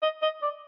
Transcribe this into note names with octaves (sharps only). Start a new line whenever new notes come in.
D#5
D#5
D5